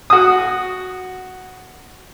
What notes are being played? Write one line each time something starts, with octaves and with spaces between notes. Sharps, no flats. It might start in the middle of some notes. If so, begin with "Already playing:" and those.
F#4 D#6